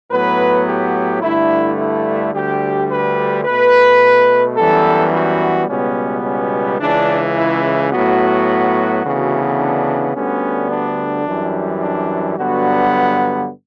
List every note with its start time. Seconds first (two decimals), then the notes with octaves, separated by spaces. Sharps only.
0.11 A2 F#3 B3 B4
0.67 G4
1.22 G2 D3 A3 E4
1.78 E4
2.33 D2 D3 G3 G4
2.90 B4
3.45 B2 A3 B4
4.57 F#2 E3 G3 B3 A4
5.13 F#4
5.68 C#2 B2 G3 B3 C#4
6.24 C#4
6.80 C#2 C#3 E3 D4
7.35 E4
7.91 A2 F#3 B3 F#4
9.03 D2 C#3 E3 B3
9.59 D4
10.14 D2 D3 G3 B3 C#4
10.70 D4
11.26 F#2 E3 G3
11.81 D4
12.37 G2 D3 F#3 B3 F#4